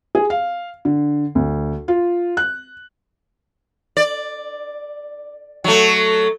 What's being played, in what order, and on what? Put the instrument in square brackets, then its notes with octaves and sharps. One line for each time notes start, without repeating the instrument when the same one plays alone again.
[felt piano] G#4
F5
D3
D2
F4
F#6
[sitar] D5
F#3 A3